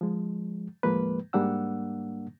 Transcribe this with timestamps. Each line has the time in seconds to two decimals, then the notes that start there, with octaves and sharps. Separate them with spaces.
0.01 F3 G#3
0.83 D#2 A2 F3 G#3 A#3 B4
1.33 G#2 G3 A#3 D4 F#5 E6